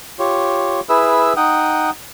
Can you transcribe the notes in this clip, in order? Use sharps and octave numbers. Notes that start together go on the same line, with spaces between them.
F4 G4 C#5
E4 G#4 B4 E5 E6
D#4 F#5 G5 D#6